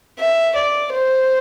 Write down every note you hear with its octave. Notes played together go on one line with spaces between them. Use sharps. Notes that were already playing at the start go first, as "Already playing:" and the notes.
E5
D5
C5